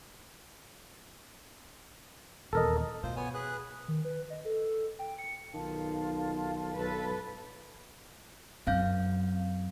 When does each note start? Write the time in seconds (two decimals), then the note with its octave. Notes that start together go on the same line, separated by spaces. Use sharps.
2.53 D#1 E2 A4 A#4 D#5
3.03 B2 F4 C5
3.16 B3 C#5 G#5
3.34 G#4 B4 F#6
3.88 D#3
4.05 B4
4.30 D#5
4.45 A4
4.99 G5
5.18 C#7
5.54 B1 D#3 F4 F5 A5
6.76 B1 A4 B4
8.67 F#2 C4 F5 G6